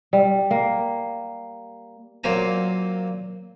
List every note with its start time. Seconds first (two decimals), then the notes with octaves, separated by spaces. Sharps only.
0.13 G3
0.51 A#3
2.24 A#2 F#3 A#3 C4 G#5 A#5